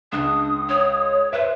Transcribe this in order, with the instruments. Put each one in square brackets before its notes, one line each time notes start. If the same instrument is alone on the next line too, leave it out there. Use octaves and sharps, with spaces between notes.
[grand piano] C#2 [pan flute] D4 [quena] D#6
[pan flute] C#5
[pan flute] B4 [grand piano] C5 E5